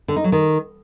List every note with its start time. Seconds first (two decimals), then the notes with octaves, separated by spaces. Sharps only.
0.08 D3
0.16 D#4
0.24 F#3
0.32 D#3